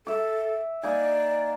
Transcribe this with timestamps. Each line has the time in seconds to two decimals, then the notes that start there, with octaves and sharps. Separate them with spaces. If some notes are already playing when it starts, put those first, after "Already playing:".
0.07 A4 E5 D6
0.83 A#3 D#4 D5 G#5